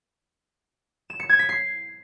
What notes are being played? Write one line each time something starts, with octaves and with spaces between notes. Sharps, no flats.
E7
C#7
G#6
B6
C7